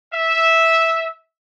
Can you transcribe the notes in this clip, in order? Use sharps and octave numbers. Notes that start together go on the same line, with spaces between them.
E5